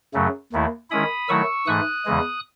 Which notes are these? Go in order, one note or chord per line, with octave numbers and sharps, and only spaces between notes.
F#2 C#3 F#3 A3
D#2 D#3 A3 E4
D#3 G#3 C#4 E4 B5 D#6
D#3 F#3 A3 E4 C#6 E6
G#2 E3 A3 D#6 F#6
E2 C#3 E3 G#3